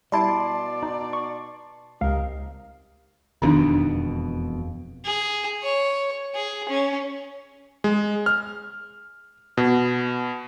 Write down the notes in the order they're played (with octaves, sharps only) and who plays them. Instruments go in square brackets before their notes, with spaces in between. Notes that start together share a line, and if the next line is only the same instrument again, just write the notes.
[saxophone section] B2 D5 [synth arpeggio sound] G3 E4 D7 [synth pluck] A5 C6
[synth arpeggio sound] D#4
C#6
[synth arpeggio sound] C#2 F5 [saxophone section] C3 D#4 A#4
[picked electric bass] E1 F2 B2 [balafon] D#3 D4 D#4
[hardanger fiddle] G#4
C#5
G#4
C#4
[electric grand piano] G#3
F6
B2